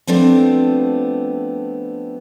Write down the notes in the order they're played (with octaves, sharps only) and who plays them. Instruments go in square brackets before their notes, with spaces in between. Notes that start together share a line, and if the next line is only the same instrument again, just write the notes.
[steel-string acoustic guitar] F3 G3 A3 B3 C4 D4